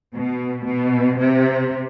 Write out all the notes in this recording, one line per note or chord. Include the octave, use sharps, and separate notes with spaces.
B2
B2
C3